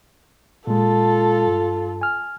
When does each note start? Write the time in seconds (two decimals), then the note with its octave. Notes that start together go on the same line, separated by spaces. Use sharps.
0.67 A#2 G#3 F4 A4
1.47 G2
2.01 G#5 F6